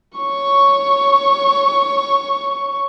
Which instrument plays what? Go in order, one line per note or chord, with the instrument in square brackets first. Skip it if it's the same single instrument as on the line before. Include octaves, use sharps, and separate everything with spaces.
[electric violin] C#5 C#6